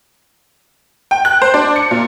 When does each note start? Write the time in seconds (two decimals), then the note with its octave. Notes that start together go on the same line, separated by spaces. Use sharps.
1.11 G5
1.25 F#6
1.42 C5
1.54 D4
1.76 C#7
1.91 A#2